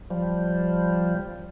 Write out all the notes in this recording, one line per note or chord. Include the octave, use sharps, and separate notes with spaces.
F3 G3